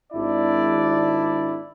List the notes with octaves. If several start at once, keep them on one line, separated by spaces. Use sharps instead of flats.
G#1 D4 E4 D5